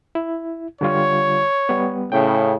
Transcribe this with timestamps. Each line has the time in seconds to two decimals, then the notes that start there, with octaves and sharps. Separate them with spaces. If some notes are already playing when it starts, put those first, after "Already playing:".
0.15 E4
0.81 D3 G3 F4 C#5
1.69 G3 B3
2.12 A2 C#3 G5